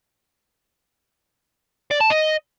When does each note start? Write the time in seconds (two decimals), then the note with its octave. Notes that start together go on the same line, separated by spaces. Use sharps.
1.91 D5
2.00 A5
2.10 D#5